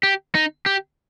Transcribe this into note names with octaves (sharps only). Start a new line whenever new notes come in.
G4
D#4
G4